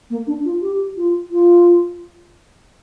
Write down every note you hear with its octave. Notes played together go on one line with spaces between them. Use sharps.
A#3
D4
F4
G4
F4
F4